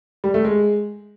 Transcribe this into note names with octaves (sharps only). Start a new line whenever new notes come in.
G3
A3
G#3